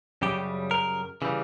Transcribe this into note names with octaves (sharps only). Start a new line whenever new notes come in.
F#2 C#3 G3 G4
A#4
C#3 E3 G3